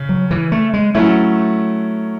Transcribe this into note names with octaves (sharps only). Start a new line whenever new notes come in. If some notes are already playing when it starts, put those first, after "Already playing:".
Already playing: C#3
F#3
E3
A3
G#3
F#3 A3 C#4 E4